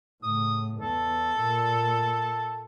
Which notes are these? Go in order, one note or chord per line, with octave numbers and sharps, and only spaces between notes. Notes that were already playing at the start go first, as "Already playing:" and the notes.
A2 C#3 D#6
E2 A4
A#2